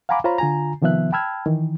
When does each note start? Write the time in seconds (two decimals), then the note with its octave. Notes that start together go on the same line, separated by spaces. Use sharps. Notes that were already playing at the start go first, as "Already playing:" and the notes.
0.09 F5 F#5 G#5 A#5 B5 D6
0.24 F4 C5 C#5 F5 A#5 B5
0.38 D3 F4 G#5 A#5
0.82 C3 D#3 F3 B3 E5 F#6
1.12 G5 A5 B5 E6 F6 G#6
1.46 D#3 E3